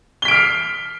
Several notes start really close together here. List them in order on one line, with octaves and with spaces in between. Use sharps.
G7 B6 D7 F6 C7